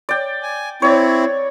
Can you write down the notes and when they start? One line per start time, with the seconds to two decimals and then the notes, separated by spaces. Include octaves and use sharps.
0.09 D5 G5
0.43 G#5
0.82 C4 E4 C#5 D5